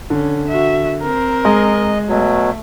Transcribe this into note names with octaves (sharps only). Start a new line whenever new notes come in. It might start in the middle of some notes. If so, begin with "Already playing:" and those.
D3 C#4
F#4 E5
C4 A#4
G#3 D#5
B2 F#3 A3